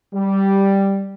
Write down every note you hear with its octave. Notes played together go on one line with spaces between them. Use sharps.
G3